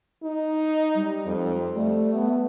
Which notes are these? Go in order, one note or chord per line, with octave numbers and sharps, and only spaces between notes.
D#4
G3
F2
G3 A3
B3